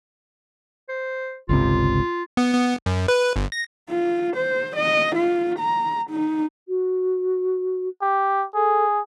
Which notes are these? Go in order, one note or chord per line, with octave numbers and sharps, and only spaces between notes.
C5
G1 C#2 C3 F4
B3
B3
F#2
B4
G1
A#6
F4
C5
D#5
F4
A#5
D#4
F#4
G4
G#4 A4